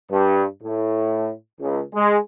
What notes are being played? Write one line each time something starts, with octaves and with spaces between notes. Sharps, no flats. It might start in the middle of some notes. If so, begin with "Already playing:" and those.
G2
A2
C#2
G#3